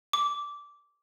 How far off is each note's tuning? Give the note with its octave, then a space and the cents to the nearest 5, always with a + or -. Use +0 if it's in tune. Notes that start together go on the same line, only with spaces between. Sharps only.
D6 -15